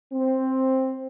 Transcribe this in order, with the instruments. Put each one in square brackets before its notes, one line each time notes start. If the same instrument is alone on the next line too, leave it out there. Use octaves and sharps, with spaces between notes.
[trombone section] C4